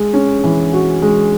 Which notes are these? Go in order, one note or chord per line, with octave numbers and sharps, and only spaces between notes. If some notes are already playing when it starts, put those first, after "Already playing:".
Already playing: G#3
C#4
E3
F#4
G#3